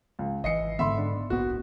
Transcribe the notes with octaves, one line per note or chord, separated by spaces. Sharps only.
C#2
G#1 E3 D#5 C7 C#7
G#2 D3 B3 E5 B5 C6
D4
D1 A#1 B3 F#4